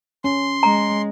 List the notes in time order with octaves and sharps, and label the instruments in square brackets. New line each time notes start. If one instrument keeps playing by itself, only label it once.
[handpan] C#4 [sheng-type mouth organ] C6
[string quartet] G#3 [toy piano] A#5